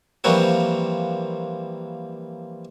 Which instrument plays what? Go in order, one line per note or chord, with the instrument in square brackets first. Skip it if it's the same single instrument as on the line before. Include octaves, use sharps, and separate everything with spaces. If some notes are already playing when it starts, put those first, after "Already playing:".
[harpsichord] E3 F3 G3 A#3 C4 F#4